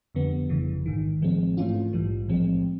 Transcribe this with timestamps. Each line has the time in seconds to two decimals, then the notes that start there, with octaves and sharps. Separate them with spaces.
0.15 F2 D3 G3 B3
0.49 G1 F2 C#3 E3
0.86 A1 G#2 D#3
1.21 A1 A2 F3 G#3 C4
1.57 G#2 E3 A3 C#4 F4
1.93 A#1 G#2 E3 G3
2.28 B1 A2 F3 G#3 C4